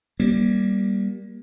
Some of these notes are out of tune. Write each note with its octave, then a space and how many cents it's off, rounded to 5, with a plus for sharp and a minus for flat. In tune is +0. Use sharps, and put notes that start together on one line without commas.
G3 +0 A#3 +25